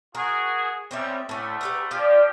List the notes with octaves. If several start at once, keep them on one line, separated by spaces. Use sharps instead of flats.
F#4 G#4 A#4
C#2 G3 C4 C#5 E5
D2 A2 A3 C#4
G4 B4 A#5
F3 F4 G4 D5